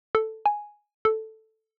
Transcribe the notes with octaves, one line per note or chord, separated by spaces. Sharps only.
A4
G#5
A4